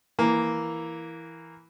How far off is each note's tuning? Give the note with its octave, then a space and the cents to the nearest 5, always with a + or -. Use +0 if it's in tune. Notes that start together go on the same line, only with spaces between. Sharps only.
E3 +0 A#3 +0